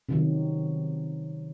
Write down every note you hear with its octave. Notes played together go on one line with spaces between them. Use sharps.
C3 D#3 F#3